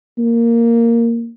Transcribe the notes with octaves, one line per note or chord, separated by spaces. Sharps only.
A#3